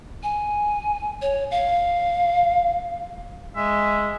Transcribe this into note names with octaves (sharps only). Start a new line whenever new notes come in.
G#5
C#5
F5
G#3 E5